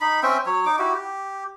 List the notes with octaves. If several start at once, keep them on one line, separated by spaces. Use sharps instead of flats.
D#4 B5
C4 C#4 E5 G5
F#3 C#5
D#4 D6
E4 F#4 G4
G4